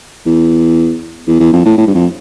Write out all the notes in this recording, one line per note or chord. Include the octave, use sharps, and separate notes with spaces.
E2
E2
E2
F2
A2
A2
G2
F2